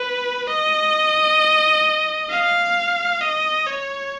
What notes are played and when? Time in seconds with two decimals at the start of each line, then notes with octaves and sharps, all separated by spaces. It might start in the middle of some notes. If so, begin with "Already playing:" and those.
Already playing: B4
0.47 D#5
2.30 F5
3.21 D#5
3.67 C#5